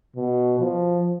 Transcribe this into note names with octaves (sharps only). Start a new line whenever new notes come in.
B2
F3